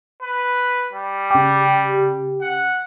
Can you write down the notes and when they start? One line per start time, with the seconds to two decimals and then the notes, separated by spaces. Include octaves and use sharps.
0.22 B4
0.93 G3
1.31 C#3 G4
2.41 F#5